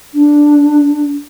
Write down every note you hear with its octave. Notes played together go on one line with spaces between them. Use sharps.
D4